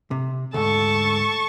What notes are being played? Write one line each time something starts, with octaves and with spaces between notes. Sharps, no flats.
C3
D2 G#2 A4 A5 C#6